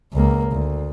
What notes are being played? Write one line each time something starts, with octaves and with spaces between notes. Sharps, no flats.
C#2 A#3
D2